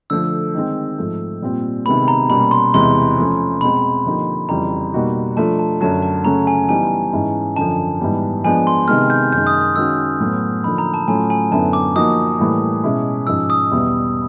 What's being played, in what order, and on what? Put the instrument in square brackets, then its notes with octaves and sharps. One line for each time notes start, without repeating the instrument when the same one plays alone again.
[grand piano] D3 F3 A3 [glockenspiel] E6
[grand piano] D#3 G#3 C4
G#2 F3 A3
A#2 G3 C4 F4
[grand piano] C3 D#3 G#3 B3 [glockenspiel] B5
[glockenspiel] A#5
[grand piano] B2 G3 A#3 C#4 [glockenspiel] B5
[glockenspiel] C6
[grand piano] E2 C3 E3 G#3 [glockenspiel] C6
[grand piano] F3 A3 C#4
[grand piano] B2 G#3 C4 [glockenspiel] B5
[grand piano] D3 F3 A#3 D#4 G4
[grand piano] F2 C#3 E3 G3 [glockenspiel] A#5
[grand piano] B2 G3 A#3 D#4 F#4
[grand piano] F3 A3 D4 F4 [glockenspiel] A5
[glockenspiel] A5
[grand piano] F#2 D3 F#3 [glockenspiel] A5
[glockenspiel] A5
[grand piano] C#3 F#3 A3 C#4 [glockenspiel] A#5
[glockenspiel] G#5
[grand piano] E3 G3 B3 D#4 [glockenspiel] G#5
[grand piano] G#2 E3 G#3 C#4 E4
[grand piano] F#2 D3 F3 [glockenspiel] A5
[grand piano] G#2 E3 G3 B3
[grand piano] F3 G#3 B3 D4 [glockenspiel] G#5
[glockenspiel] C6
[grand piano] C3 D#3 G#3 B3 [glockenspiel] F6
[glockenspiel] G6
[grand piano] F#2 D#3 G#3 [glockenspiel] G6
[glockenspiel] D#6
D#6
[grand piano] D#3 G#3 C#4 F#4 [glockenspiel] E6
[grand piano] A2 F#3 B3
[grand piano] D3 F3 A#3 D#4 [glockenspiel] B5
[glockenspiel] A#5
A5
[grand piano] A2 F#3 A3 C#4 F4 [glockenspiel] G#5
[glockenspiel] G#5
[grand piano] F#2 D3 F#3 B3 E4 [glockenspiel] A5
[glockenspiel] D6
[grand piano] F3 A#3 D#4 F#4 [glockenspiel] D#6
[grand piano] A2 E3 G3 A#3
B2 G#3 C#4 E4
[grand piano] G#2 F3 G#3 C#4 [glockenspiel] E6
[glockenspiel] D#6
[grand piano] E2 B2 G3 B3 E4